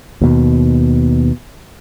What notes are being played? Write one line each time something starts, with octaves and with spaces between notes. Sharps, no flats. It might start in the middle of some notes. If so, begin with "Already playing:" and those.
D#2 B2